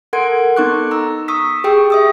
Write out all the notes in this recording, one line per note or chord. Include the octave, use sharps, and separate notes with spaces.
A4 A#4 F#5 C6 G#6 D7
B3 D#4 A4 C#6 D6 F#6
A#5 E6
C#6 D#6 E6 B6
G4 G#4 G5 C#6 E6
E5 D#6 E6